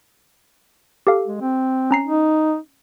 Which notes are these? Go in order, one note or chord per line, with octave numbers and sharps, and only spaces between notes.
G4 A4 F5
G#3
C4
C#4 A#5 C7
D#4